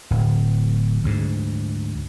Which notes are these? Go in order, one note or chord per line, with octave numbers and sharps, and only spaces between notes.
D1
D2 G#2